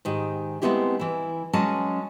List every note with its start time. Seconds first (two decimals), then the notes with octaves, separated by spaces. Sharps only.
0.05 G#2 D#3 G4
0.62 G#3 A3 B3 C4 E4 G4
0.99 E3 E4
1.53 F#3 G#3 C#4 A5